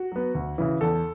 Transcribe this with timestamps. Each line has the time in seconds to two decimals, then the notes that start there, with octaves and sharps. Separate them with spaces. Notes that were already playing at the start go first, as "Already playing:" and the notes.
Already playing: F#4
0.12 F#3 B3
0.35 D2
0.58 C#3 E3
0.81 E2 A4